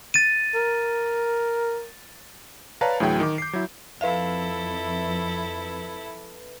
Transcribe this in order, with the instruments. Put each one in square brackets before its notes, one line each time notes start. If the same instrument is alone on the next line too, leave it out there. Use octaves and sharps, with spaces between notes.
[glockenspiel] A6 D#7
[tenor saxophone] A#4
[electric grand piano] B4 C#5 D5 F5 A5 A#5
D2 A2 E3 F#3 G#4 G5
D#3 D6
G6 C7
F#3 E4
[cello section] F2 [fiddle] E4 A4 [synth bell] B4 E5 [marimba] F5